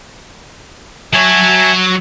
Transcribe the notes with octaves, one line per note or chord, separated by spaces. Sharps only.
F#3 C#5 E5 G#5 A5